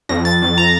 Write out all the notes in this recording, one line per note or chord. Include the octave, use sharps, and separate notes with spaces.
F2 A#6
A6
F2
A#5